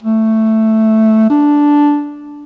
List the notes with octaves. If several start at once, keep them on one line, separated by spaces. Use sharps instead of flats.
A3
D4